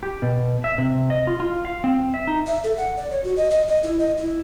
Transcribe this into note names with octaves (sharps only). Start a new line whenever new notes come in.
G4
B2
E5
C3
D#5
F4
F4
F5
C4
E5
D#4
E5
A4
F#5
D5
C#5
F#4
D#5
D#5
D#5
E4
D#5
E4